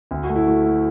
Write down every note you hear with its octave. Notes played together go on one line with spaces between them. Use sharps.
D2
F#4
A3
E4
A3
A3